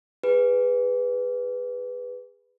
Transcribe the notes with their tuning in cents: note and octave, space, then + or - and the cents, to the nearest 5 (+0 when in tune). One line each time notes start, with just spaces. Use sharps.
G#4 -25 B4 +0